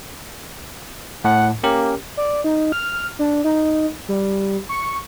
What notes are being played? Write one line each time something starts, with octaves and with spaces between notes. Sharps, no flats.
A2 F#5
A#3 C#4 G4 A#4
D5
D#4
F6
D4
D#4
G3
C#6